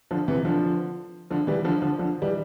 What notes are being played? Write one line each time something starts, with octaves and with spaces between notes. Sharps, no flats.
D3 F3
C3 E3
D3 F3
D3 F3
E3 G3
D3 F3
D3 F3
D3 F3
E3 G3